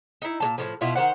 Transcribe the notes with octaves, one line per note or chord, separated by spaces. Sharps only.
D#4 E4
A#2 G#3 A5
A2 C#3 F3
B2 E4 F4
D#3 G3 C5 F#5